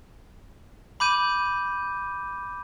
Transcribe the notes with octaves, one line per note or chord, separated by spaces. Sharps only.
B5 D6 G6 D#7